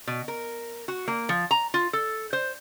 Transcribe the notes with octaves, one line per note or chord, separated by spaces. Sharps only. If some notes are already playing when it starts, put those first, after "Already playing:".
B2
A#4
F#4
A#3
F3
A#5
F4
A4
C5